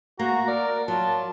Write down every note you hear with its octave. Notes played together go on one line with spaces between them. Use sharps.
A#3 F#4 A#5
A#4 D5
F#3 F4 A5